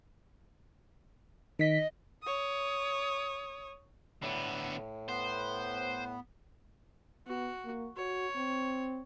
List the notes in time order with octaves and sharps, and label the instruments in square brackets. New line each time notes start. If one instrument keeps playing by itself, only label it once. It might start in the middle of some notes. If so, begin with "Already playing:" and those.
[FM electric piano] D#3 B6 [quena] D#5
[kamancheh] C#5 D#6
[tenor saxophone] A2 [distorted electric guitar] D3 B3
[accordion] B3 [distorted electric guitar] C5
[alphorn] B3 [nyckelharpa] F#4
[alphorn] A#3
[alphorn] F#4 [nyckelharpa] C#5
[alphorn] C4